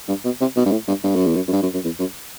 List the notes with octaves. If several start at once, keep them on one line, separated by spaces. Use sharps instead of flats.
G2
B2
C3
B2
G2
A2
G2
G2
F#2
E2
F#2
F#2
G2
F#2
F#2
E2
F#2